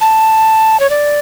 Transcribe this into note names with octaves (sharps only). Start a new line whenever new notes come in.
A5
C#5
D5